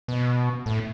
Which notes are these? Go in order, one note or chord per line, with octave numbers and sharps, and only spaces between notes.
B2
A2